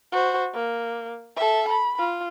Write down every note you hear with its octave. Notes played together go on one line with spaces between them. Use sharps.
F#4 C5
A#3
A4 E5
B5
F4